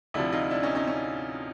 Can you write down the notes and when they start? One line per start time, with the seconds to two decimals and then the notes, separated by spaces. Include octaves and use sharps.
0.14 D2 C3 F3 D4 E4
0.32 D#4 F4
0.51 D4 E4
0.63 C#4 D#4
0.75 C#4 D#4
0.88 C#4